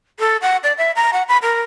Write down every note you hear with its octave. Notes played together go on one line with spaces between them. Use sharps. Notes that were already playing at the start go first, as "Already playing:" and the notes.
A4
F#5
D5
E5
A#5
F#5
B5
A#4